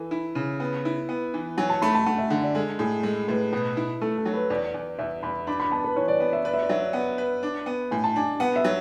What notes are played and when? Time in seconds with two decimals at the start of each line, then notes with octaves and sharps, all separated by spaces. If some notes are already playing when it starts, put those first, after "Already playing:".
Already playing: E3 A4
0.11 E4
0.35 C#3
0.60 B3
0.85 E4
1.09 B3
1.34 E3
1.57 F#3 G#5
1.70 A5
1.82 A3 B5
1.95 A5
2.06 A3 F#5
2.18 E5
2.30 D3 F#5
2.43 D5
2.55 G#3 A4
2.79 A2 G#4
3.03 G#3 A4
3.28 A2 B4
3.53 B2 B4
3.77 E4
4.01 A3 A4
4.18 A4
4.25 F#3
4.34 B4
4.50 E2 D5
4.74 E2
4.99 E2 E5
5.23 E2 B5
5.47 D4 B5
5.60 B5
5.71 B3 A5
5.84 B4
5.96 E3 C#5
6.08 D5
6.20 B3
6.33 E5
6.45 B4 D5
6.54 E5
6.62 D5
6.69 F#3 E5
6.80 D5
6.93 B3 F#5
7.18 B4
7.43 D4
7.66 B3
7.91 A2 G#5
8.04 A5
8.16 D4 G#5
8.40 B3 F#5
8.56 E5
8.65 F#3